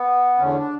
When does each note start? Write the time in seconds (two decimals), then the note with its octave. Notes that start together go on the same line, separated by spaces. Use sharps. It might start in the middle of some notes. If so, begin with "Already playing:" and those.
Already playing: B3
0.38 E2 D3 A3 C#4
0.56 D4